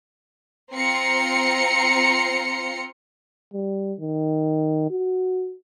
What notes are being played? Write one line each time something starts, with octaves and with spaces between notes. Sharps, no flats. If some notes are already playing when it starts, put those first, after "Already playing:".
C4 F4 A#5 C6 C7 C#7
G3
D#3
F#4